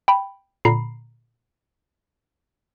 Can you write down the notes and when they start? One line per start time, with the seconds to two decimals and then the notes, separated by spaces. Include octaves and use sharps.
0.08 G5 B5
0.65 A#2 D3 A#5 B5 C7